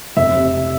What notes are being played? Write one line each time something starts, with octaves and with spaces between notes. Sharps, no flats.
F1 E5
C3